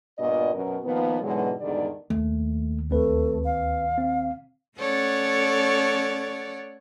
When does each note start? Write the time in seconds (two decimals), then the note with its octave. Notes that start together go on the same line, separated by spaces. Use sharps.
0.19 G2 A#2 B3 F#4 D5 D#5
0.54 F#2 B2 A#4
0.84 A#2 D#3 F3 B3
1.21 G#2 B2 D3 E3 F#3 G#3
1.61 E2 G#2 D3 D#3 G3 D5
2.10 D#2 A3
2.90 D2 A3 C4 B4
3.45 F5
3.98 C4
4.77 A3 C#4 A4 C#5 D5 F#5